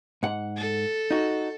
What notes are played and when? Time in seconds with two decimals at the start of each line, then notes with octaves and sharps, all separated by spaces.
0.23 G#2 F#5
0.57 A4
1.11 D#4 F#4